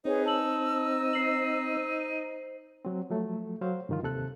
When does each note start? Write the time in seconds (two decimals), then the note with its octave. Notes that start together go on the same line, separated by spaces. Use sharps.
0.05 C4 D#4 G#4 B4 C#5
0.26 A5 E6 F#7
1.13 C5 C7 F#7
2.85 F#3 C4
3.10 F3 F#3 A3
3.62 F#3 C5 F5
3.89 G2 D3 D#3 F3 F4
4.03 D#2 C3 A4 F#6